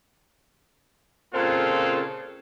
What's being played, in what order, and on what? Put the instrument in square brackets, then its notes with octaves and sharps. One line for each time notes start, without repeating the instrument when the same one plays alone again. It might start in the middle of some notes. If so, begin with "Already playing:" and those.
[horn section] A#2 C#3 C4 F4 A4